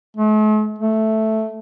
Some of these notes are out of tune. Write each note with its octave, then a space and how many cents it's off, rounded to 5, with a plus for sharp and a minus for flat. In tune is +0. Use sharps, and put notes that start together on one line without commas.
A3 -45
A3 -5